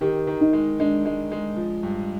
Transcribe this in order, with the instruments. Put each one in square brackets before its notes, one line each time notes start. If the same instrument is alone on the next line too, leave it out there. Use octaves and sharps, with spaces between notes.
[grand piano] D#3 [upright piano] G4
[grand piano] D#3
[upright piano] D#4
[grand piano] G#3
[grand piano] G#3 [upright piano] D4
[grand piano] G#3
G#3
F3
G2